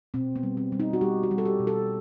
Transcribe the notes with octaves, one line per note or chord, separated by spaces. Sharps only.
B2 C4
B3
G3
C4
G3
D#4
F#4
G3 G4
F#4
G3
A4
G4
B2
A4